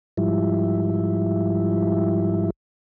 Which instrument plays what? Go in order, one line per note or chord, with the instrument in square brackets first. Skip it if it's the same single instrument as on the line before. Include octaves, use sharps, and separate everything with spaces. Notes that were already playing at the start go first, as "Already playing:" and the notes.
[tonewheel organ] G#2 F3 G3 E4